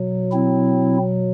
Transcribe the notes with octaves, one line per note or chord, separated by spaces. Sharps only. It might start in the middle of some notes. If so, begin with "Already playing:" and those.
Already playing: B2 F#3
C4 E4